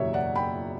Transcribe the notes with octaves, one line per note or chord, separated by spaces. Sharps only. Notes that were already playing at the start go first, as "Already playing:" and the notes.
Already playing: F#1 E2 B2 G4 C#5 E5
D5 F#5
G5 B5